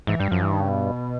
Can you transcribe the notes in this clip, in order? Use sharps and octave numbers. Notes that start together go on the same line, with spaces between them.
G#2 E3
G2 G3
F#2 F3
G2 E3
D#3
C#3
B2